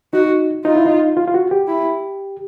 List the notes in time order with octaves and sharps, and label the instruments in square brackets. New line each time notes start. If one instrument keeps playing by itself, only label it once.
[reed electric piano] D#4 [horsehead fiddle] F#4
[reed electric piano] D#4 [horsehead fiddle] F4
[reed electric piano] E4
D#4
F4
F4
F#4
G4
[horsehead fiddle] E4